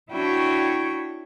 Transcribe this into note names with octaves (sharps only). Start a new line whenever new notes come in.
D4 E4 F#4 C#5 G5 C#6